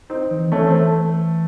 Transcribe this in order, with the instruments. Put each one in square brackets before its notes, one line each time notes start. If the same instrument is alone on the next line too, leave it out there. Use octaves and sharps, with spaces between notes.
[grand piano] C4 D#4
[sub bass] E3
[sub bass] E3 [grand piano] A3 C#4
[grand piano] C4
A3